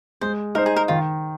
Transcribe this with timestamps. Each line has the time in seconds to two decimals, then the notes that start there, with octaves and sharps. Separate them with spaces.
0.21 G#3 C5
0.55 D#4 A#4 C5
0.66 G#4
0.76 A#4
0.88 D#3 F4